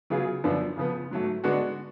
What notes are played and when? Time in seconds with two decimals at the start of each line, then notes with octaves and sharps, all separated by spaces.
0.10 C#3 F#3 B3 F4 G#4
0.44 F#2 D3 F3 B3 D4
0.77 C#3 F3 B3
1.11 G#2 F#3 A3
1.44 D3 G#3 B3 D4 F#4